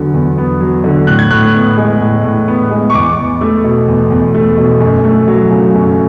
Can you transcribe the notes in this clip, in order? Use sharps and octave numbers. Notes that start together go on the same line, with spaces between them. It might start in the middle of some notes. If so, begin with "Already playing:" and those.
Already playing: E2 D3 F#3 B3
E2
B3
F#3
D3
A2 F#6
G#6
A2 F#6
B3
G#3
A2
A2
B3
G#3
C#6
E2 D6
E2
A3
B2
E2
E2
A3
B2
F#2
A3
F#3
C#3
F#2